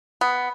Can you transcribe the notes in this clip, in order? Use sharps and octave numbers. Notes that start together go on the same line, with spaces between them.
B3